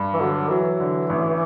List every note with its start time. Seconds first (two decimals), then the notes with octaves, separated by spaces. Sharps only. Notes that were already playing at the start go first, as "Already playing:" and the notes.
Already playing: G2
0.14 E3
0.20 D3 F#3
0.51 E3 F#3
0.80 D3
1.10 A1